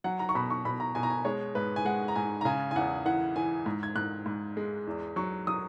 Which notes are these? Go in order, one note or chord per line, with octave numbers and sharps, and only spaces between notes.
F#3 F#5
A#5
C#6
B2 B5
C#6
B2 B5
A#5
B2 G#5
A#5
G#5
G#3 C#5
G#2 B4
G#5
G#3 F#5
A#5
G#2 G#5
A#5
C#3 G#5
G#5
E2 F#5
E3 F#5
E3 G#5
G#2
G#6
G#2 F#6
G#2
G#3
E2
F#3 C#6
F#3 D#6